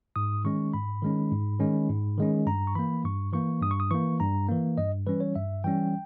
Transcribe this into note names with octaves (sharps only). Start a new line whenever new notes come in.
G#2 D#6
D#3 G#3 C#4 C#6
G#2 B5
D#3 G#3 C#4
G#2
D#3 G#3 C#4
G#2
D#3 G#3 C#4
G2 A#5
C#6
E3 A#3 B5
G2 C#6
E3 A#3 C#6
G2 D#6
C#6
D#6
E3 A#3 C#6
G2 A#5
E3 A#3
G2 D#5
E3 G3 C#4 B4
C#5
G2 E5
E3 G3 C#4 G5